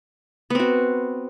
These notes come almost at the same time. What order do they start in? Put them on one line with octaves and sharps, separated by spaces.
B3 C4 F#4